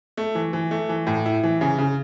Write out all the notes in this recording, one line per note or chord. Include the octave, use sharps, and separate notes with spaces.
A3
E3
E3
A3
E3
A2
E4
E3
C#3
C#3